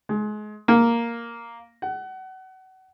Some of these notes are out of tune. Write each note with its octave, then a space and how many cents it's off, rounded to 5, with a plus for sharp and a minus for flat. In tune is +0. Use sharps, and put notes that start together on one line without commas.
G#3 +30
A#3 +0
F#5 +30